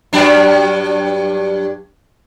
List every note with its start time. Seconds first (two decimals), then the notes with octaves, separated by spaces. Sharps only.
0.13 G2 F#3 D4